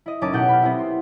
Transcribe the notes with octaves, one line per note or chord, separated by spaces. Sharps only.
E4 D#5
F#1 C#4 D#4 A5 D6
B2 G4 A4 F#5 G6 D7
B5 F6
B3 C4 E4
C6